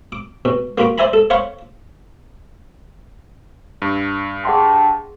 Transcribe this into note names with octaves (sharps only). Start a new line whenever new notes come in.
D6
B2
A#3 F4 F#4 B5 D6
C5 D5 E5 G#5 A#5 B5
A4
C5 C#5 F5 F#5 B5 C#6
G2
G#4 F#5 G5 A5 C6